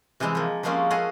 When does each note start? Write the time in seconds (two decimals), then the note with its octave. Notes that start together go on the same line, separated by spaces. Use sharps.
0.20 C3 E3 G3 G#3 E4
0.35 F3 A#3
0.63 F3 G3 G#3 A#3 C4 C#4
0.90 G#4 A4 C#5 D#5 F5 F#5